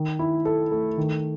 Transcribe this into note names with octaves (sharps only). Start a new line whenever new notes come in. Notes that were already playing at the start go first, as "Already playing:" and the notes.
Already playing: D#3
E4
A4
A3
D#3